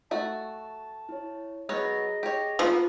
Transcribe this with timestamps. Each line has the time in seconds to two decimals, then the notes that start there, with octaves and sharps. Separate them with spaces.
0.11 A3 F#4 A5
1.09 E4 C#5
1.69 F#3 B3 G#4 C#5 D#5
2.23 G4 C#5
2.59 F3 A#3 B3 F#4